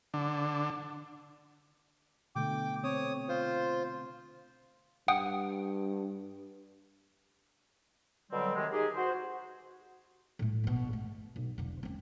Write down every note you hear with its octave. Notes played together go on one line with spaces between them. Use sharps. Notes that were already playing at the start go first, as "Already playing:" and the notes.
D3
B2 D3 A3 G5 D6
C4 C#5 D#6
F4 C5
G2 F#5 G5 D#6
B2 D3 F#3 G3 C4
C3 D#3 G#3
D#4 G4 G#4
F#4 C5
A2 A3
G1 B2
A3
B1
E1 D3
C4 C#4